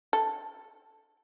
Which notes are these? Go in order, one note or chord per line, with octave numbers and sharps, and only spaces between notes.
A4